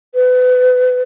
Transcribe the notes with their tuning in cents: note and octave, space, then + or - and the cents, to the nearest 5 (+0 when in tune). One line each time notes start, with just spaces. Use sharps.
B4 +30